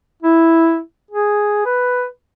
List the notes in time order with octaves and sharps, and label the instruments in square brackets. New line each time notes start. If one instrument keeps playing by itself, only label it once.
[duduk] E4
G#4
B4